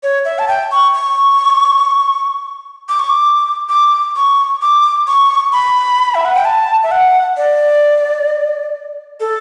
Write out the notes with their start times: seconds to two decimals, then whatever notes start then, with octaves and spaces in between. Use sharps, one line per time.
0.03 C#5
0.25 E5
0.39 A5
0.48 G5
0.71 C#6
0.94 C#6
2.89 D6
2.99 C#6
3.09 D6
3.69 D6
4.16 C#6
4.62 D6
5.07 C#6
5.52 B5
6.15 E5
6.25 F#5
6.35 G5
6.45 A5
6.83 E5
6.91 F#5
7.37 D5
9.20 A4